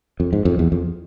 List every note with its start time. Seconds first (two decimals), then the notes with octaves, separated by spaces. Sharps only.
0.20 F2
0.33 G#2
0.45 F2
0.59 E2
0.72 F2